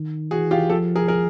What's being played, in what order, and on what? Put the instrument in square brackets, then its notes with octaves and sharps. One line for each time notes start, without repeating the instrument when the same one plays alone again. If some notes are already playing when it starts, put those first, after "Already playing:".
Already playing: [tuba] D#3
[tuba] E3 [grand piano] F#4 G#4
[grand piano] F4 G4
[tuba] F3 [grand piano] G4 A4
[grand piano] G#4 A#4
G#4 A#4